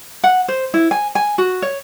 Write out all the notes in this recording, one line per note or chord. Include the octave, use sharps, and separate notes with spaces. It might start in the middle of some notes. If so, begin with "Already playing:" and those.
F#5
C5
E4
G#5
G#5
F#4
C#5